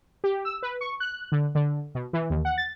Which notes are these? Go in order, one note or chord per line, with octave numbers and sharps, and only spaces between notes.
G4
E6
B4
C#6
F#6
D3
D3
B2
E3
D#2
F#5
A6